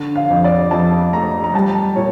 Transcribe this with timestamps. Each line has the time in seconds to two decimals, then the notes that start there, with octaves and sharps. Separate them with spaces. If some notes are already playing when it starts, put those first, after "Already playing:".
Already playing: D3
0.16 F5
0.30 F2
0.44 D5
0.71 F2 A5
1.12 A3 A#5
1.44 A#5
1.54 G3 A5
1.96 A#2 C#5